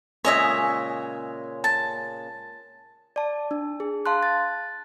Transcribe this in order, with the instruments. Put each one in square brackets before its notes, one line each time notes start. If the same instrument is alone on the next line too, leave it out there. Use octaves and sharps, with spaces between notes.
[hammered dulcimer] A#2 C#3 G#3 [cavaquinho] C#5 D#5 E5
[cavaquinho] A5
[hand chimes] D5 A5
D4
G#4
F5 A5 C6 F#6
A6